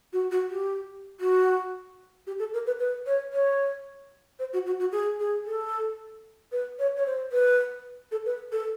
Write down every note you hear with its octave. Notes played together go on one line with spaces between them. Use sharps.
F#4
F#4
G4
F#4
G4
A4
A#4
B4
B4
C#5
C#5
C5
F#4
F#4
F#4
G#4
G#4
A4
B4
C#5
C#5
C5
B4
A4
B4
A4